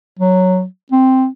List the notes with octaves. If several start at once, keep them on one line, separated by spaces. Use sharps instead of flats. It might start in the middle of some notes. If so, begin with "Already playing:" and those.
F#3
C4